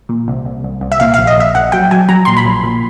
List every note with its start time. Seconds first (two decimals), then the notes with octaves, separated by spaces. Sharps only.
0.09 A#2
0.28 C2
0.45 C2
0.64 C2
0.81 C2
0.92 E5
1.00 A#2 F5
1.14 F5
1.19 A#1
1.27 D#5
1.37 A#1 E5
1.55 A#1 F#5
1.72 F#3 G5
1.91 F#3 G#5
2.09 F#3 A#5
2.25 A#2 C6
2.37 B5
2.45 A#1
2.63 A#2